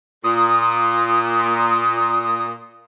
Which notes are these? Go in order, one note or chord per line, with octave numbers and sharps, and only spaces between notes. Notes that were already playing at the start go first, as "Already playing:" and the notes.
A#2 D#6